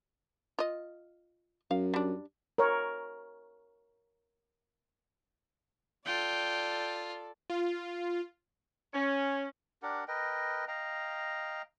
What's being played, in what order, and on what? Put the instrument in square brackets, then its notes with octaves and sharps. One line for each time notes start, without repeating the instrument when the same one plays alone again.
[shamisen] F4 D#5
[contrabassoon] F#2 [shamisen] F5
[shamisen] G3 D4
[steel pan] A#4 C#5
[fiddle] F4 [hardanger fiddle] A4 D5 [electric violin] G5
[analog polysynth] F4
[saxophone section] C#4
[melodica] D4 G4 A#4 F#5
A#4 B4 D#5 G5
D#5 F5 G5 A#5